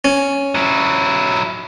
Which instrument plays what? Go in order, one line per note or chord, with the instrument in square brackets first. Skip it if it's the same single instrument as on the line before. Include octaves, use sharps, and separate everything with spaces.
[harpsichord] C#4
[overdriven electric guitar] F#3 E4